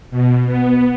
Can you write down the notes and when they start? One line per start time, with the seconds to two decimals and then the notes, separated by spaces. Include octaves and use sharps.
0.11 B2
0.46 B3